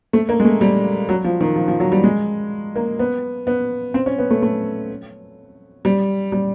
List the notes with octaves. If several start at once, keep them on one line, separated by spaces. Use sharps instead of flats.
A3
A#3
G#3
A3
G3
F#3
F3
D#3
F3
F3
F#3
G3
G#3
A#3
B3
B3
C4
C#4
B3
A3
A3
G3
G3